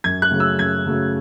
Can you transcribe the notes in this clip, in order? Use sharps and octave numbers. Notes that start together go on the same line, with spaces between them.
F#2 G#6
F#6
C#3 F#3 A3 C#4
E6
F#2 G#6
C#3 F#3 A3 C#4